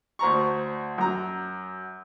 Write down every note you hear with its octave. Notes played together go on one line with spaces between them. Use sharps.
D2 C5 A#5 C#6
F#2 A#5